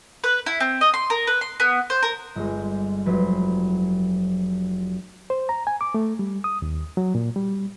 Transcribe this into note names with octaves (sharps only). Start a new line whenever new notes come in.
B4
E4
C4
D#5
C6
A#4
B4
C6
B3
C5
A#4
G1 G#3
F1 F#3 B4 C5
C5
A#5
G#5
D6
A3
G3
D#6
D#2
F#3
A#2
G3